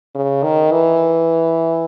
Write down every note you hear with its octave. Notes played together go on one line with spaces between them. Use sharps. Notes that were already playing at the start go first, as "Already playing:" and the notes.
C#3
D#3
E3